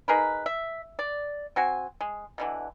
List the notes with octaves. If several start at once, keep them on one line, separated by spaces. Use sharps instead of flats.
D#4 G#4 A#4 B4
E5
D5
C4 F#4 G#5
G#3
B2 D3 E3